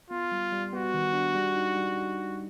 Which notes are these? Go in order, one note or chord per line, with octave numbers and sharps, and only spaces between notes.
B3 F4
G3
G3
B3 F#4
D#3
D4
G3
D#4
G3
D#4
G3